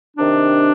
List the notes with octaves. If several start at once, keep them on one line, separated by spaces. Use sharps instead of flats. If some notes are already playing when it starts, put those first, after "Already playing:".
C3 D#3 D4